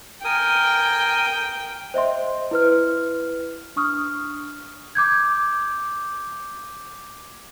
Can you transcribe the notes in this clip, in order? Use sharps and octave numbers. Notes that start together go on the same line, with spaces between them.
A#4 G5 G#5 D#6
C5 D#5 E5 C6
E4 B4 F6
D4 C#6 D#6 F6
D6 G6 G#6